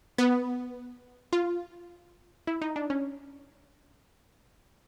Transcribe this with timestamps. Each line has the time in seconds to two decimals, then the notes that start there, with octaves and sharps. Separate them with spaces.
0.18 B3
1.33 F4
2.47 E4
2.62 D#4
2.76 D4
2.90 C#4